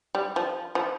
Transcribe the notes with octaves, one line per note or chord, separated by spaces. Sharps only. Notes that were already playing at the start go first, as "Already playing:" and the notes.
G3
F3
F3